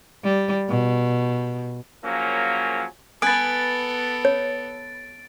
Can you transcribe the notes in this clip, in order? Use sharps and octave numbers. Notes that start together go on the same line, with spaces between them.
G3
B2
F3 F#3 A#3 C#4 G#4 A#4
B3 A4 B4 G#5 D#6 A6 D7
C#5